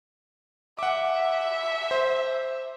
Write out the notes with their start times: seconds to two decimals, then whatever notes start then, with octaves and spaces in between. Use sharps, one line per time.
0.79 E5 F#5 D6
1.91 C5